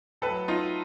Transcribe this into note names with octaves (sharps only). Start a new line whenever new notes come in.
A2 F#3 A4 B4
D#4 F4